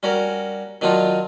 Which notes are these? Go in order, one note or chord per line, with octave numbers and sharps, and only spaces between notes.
G3 C#4 F#4 A#4
D#3 F#3 D4 D#4 F4